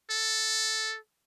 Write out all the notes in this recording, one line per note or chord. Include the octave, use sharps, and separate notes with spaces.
A4